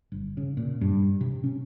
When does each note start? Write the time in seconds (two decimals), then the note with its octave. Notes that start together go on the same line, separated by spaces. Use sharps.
0.12 G1
0.37 C#3
0.57 A#2
0.81 G2
1.21 C3
1.44 C#4